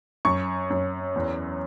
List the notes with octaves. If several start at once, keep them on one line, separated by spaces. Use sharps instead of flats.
F#2 C#6
F#2
E2